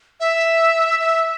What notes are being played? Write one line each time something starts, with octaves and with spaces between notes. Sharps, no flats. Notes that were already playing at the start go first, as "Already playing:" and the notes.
E5
E5